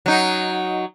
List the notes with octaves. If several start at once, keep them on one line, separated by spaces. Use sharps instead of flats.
F#3 D#4